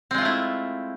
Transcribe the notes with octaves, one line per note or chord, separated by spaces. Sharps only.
G#3 A3 C4 E4 F4